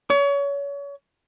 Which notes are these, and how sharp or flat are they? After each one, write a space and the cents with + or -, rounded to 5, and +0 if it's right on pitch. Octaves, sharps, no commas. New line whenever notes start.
C#5 +30